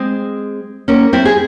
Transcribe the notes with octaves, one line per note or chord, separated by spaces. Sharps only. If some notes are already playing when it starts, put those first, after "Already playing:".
Already playing: G#3 C4
A#3 C#4
C4 E4
G#4